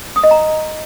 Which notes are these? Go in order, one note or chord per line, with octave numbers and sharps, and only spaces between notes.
D#6
D#5
A#5